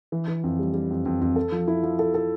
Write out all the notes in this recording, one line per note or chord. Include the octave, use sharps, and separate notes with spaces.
E3
E3
F2
G3
G3
F2
F2
F2
A4
F3
E4
F3
A4
A4